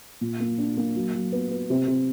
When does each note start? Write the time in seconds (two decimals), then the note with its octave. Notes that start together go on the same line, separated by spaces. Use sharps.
0.21 A#2
0.40 A#3
0.58 D4
0.77 A#3
0.96 F#3
1.14 F#3
1.32 B3
1.51 B3
1.70 C3
1.88 C3